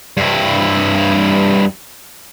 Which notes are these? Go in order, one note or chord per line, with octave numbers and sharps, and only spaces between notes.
G2 E4